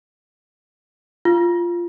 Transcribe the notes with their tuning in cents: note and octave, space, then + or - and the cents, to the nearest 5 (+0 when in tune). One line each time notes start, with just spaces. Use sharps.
F4 -10